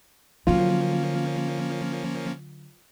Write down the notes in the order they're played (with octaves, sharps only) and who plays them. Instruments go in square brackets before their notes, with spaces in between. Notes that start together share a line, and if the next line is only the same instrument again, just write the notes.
[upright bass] D3 F#3 [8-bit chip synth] F3 A#3 C#4 [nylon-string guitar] F4